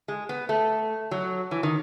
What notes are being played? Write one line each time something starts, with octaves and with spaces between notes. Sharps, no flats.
G#3
B3
A3
F#3
E3
D#3